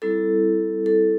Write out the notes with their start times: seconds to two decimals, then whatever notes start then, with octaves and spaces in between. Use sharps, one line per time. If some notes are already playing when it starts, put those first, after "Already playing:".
0.02 G3 C4 E4 A4
0.86 A4